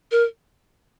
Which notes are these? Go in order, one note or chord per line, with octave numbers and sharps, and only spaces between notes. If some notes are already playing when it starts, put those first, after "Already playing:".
A#4